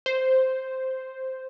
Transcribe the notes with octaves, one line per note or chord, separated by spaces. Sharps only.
C5